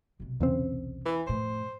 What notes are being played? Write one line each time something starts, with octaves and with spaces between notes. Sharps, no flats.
B1 C3
E2 C#3 C4
E3
F2 A2 C5